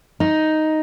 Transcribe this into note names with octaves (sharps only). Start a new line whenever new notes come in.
D#4